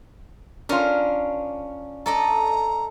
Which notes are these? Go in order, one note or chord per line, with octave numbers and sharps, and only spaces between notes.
C#4 D4 F4 A#4
A4 D5 D#5 A#5